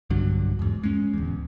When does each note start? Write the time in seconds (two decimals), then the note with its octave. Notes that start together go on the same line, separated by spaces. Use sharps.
0.10 B1 G2 D3 F#3
0.59 E2 G#2
0.84 G#3 C#4
1.13 D1 E2